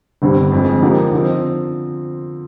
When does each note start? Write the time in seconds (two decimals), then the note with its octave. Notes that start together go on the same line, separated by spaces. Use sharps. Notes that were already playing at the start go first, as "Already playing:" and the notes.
0.22 G1 G2 D3 G3 C4
0.52 F2 D3 F3 G#3
0.82 D3 F3 A#3 D#4 G4
1.13 D3 F3 C4